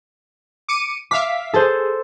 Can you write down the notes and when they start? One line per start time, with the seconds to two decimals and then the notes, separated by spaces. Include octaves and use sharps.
0.68 D6 C#7 D#7
1.11 E5 F5 D6 B6
1.54 G#4 A4 C5